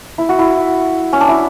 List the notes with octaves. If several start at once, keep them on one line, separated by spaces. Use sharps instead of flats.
E4
F#4
E4
C#4
D4
E4